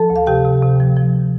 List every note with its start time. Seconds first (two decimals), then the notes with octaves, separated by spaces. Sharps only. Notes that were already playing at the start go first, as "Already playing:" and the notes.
Already playing: F3 A4 A5
0.10 D2
0.16 F5
0.27 C3 G4 G5
0.45 C3
0.62 C3
0.80 F3
0.96 F3